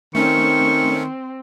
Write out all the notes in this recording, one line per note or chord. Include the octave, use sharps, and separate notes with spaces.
D#3 A3 C4 C#4 C#6